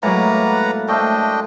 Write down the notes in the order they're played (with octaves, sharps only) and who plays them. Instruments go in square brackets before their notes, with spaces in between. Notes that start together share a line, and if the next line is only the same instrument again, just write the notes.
[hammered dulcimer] A2 A#3 [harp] F#3 G#3 [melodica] B4 F#5 A#5
[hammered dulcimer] A3 C5 F5 [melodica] D4 D#5 G5